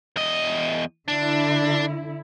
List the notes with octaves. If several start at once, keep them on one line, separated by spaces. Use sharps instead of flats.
E2 D#5
D3 D4 E4